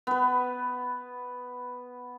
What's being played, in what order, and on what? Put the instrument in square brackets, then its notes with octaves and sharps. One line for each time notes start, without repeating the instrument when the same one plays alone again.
[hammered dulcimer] B3 B4